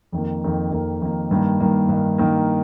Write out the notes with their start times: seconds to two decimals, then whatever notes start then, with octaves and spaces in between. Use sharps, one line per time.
0.12 F2 D#3 A#3
0.42 F2 D#3 A#3
0.72 F2 D#3 A#3
1.01 F2 D#3 A#3
1.31 G2 D#3 A#3
1.60 G2 D#3 A#3
1.89 G2 D#3 A#3
2.18 G2 D#3 A#3